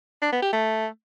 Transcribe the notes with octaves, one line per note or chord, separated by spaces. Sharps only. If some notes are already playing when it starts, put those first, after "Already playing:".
D4
B3
G4
A3